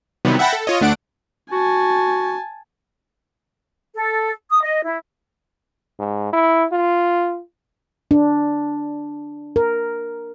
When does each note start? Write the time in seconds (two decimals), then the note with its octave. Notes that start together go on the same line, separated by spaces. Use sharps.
0.25 C3 D#3 E3 F#3 G3 B3
0.39 E5 F#5 G5 A5 B5 A#6
0.53 A4
0.67 F4 C#5 D#5
0.81 D2 A3 D4 F#5 D7
1.52 F#4 G#5 A5
3.95 A4
4.50 D#6
4.63 D#5
4.85 E4
5.99 G#2
6.33 E4
6.72 F4
8.11 D4
9.56 A#4